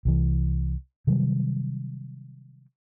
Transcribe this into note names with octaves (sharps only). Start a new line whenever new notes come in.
C2 E3
C3 D#3 F#3 G3